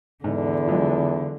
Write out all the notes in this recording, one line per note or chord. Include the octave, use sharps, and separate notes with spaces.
E2 G#2 D3
F3 F#3 G#3